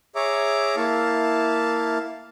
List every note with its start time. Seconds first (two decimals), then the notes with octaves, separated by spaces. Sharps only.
0.16 G#4 C#5 E5 A#5 D6
0.77 A#3 E4 F5 A5